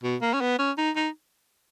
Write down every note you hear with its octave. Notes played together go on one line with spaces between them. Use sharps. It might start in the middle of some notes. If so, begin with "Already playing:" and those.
B2
A#3
C#4
B3
C#4
D#4
D#4